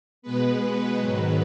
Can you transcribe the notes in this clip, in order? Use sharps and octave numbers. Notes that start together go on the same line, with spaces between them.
B2 G#3 B3 B4
G#2 D#3 F#3